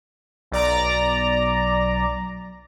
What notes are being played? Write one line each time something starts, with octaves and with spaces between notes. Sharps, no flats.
B1 D5 A#5